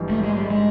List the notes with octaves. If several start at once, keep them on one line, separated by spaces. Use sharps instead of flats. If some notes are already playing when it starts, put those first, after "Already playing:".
Already playing: A#1 G#2 E3 G3
A3
G#3
G3
G#3